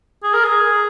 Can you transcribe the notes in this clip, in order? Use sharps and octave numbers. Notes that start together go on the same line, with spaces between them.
G#4
A#4
G#4